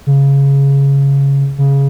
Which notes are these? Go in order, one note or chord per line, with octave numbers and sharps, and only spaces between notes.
C#3
C#3